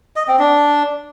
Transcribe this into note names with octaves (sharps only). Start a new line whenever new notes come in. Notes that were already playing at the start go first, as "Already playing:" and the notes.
D#5
C4
D4